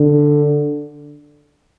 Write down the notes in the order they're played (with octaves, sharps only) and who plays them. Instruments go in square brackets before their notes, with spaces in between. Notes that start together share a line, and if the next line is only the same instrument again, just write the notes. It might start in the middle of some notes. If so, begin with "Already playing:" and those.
Already playing: [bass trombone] D3